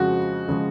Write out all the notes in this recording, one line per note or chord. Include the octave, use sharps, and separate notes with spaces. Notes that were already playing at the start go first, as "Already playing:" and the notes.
Already playing: F2 C#3 F3 G#3 F#4
C#3 F3 G#3